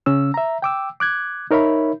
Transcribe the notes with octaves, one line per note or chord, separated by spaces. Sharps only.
C#3 C#4 E6
E5 A#5
G5 D6 E6
D6 F#6 G#6
D#4 A#4 C#5 E5 B5